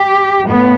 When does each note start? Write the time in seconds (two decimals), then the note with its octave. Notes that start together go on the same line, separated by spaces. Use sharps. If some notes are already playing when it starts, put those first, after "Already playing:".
Already playing: G4
0.46 A2 B3